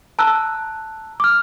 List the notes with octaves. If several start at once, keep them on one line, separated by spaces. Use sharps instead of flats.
A5 A#5 E6 F#6
D6 F6